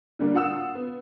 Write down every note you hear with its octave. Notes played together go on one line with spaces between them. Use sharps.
D3 G3 A#3 D4
F4 F#5 D#6 E6 E7
B3